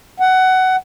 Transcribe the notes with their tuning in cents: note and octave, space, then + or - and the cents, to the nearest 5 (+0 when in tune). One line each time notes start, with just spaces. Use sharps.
F#5 +15